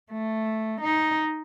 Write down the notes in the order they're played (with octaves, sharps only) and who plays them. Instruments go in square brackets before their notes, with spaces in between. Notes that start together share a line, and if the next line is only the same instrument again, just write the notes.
[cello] A3
D#4